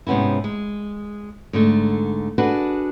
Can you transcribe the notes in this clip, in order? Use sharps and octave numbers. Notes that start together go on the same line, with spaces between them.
G#2 C3 B3 C#4 E4
G#3
G#2 D3 A3
D4 F#4 G#4 A4 B4